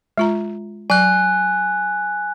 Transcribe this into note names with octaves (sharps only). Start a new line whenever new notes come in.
G#3 F4 A#5
F#3 G#5 F#6